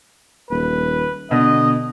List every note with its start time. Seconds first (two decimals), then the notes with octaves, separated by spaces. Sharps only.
0.51 D#1 B4
1.31 B2 D3 D#5